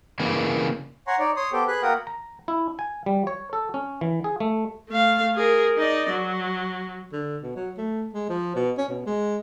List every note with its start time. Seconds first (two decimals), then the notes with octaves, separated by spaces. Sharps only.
0.20 C#3 E3 A#3
1.07 C#5 F#5 G#5 A#5 C6 C#6
1.19 D#4 C#5 D5
1.36 C#5 C6 D#6
1.53 B3 G4 A4 C5 G5
1.68 G#4 B4 B5 F#6
1.82 A#3 F#4 A#4 F#5 G5 D#6
2.07 A#5
2.48 E4
2.79 G#5
3.06 G3
3.27 C#5
3.53 A4
3.74 C#4
4.01 E3
4.24 G#4
4.40 A3
4.89 A3 F5
5.35 G#4 A#4
5.78 D#4 D5
6.10 F#3
7.12 D3
7.42 B2
7.56 F#3
7.78 A3
8.13 G#3
8.29 F3
8.56 B2
8.78 C#4
8.89 B2
9.06 G#3